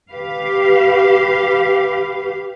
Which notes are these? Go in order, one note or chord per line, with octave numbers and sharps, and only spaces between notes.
G4 B4 F5